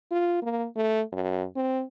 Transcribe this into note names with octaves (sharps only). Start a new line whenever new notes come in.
F4
A#3
A3
F#2
C4